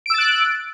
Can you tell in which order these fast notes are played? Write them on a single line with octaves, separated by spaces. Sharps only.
D7 E6 A6 F#6